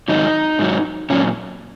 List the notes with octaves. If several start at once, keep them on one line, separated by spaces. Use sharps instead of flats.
G#2 D#3 F#3 D#4
G#2 F#3
A#2 F#3 C#4